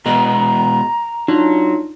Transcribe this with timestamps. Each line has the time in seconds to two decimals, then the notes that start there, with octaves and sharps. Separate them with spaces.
0.06 B2 G#3 B3 A#5
1.28 F#3 D4 D#4 F4